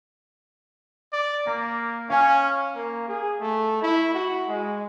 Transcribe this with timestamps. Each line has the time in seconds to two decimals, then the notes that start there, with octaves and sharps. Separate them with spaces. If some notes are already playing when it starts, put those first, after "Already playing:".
1.13 D5
1.47 A#3 A#5
2.10 C#4 F5 G#5
2.75 A#3
3.09 G#4
3.41 A3
3.82 E4
4.14 F#4
4.48 G#3